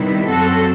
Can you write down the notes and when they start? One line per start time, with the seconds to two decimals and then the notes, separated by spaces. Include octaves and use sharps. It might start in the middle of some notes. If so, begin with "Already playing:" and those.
Already playing: C3 D#3 G3 B3 E4
0.27 F#2 F#3 C4 F#4 A4